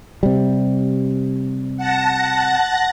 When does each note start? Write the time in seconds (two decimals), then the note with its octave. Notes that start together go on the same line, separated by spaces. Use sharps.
0.23 C3 G3
1.77 F#5 A5 A#6